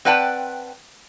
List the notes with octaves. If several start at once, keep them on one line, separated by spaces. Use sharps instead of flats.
C4 B4 D5 F#5 G5 A5